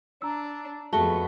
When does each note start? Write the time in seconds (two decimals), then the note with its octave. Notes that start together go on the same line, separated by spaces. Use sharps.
0.22 D4 A#5 E6
0.93 F2 A3 B3 F#4 G#4 A5 G7